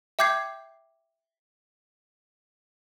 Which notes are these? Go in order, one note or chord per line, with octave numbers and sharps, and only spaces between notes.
E5 G5 D6 G6 G#6 C7